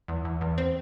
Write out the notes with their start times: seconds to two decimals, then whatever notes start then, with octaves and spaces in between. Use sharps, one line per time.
0.08 E2
0.25 E2
0.41 E2
0.58 C4